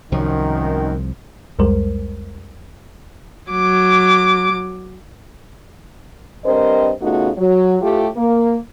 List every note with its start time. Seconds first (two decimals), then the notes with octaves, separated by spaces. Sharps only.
0.12 C2 F#2 D#3 F3
1.59 C2 F2 G3 G#3 A#4 C5
3.51 F#3 D6
6.45 G2 C4 A#4 C5 D#5
7.02 C#3 A3 B3 D#4 F4 F#4
7.37 F#3
7.81 A2 A3 F4 G4
8.16 A#3